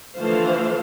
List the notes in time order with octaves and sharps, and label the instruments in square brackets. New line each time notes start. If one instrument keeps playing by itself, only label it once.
[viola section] D3 E3 F3 A3 C5 F5